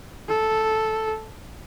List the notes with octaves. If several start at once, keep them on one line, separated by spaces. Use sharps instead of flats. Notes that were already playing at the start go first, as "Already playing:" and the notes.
A4